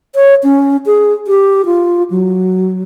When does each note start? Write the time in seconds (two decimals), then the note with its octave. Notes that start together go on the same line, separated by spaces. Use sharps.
0.15 C#5
0.43 C#4
0.86 G#4
1.27 G4
1.66 F4
2.10 F#3